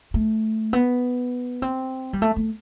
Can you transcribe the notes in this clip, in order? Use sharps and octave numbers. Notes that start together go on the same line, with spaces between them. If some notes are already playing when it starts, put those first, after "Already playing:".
A3
B3
C4
G3
A3
A3